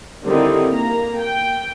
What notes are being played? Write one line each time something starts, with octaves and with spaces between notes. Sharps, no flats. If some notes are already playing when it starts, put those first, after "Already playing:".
D3 D#3 G3 C4 D#4 E4
A#3 A#5
G5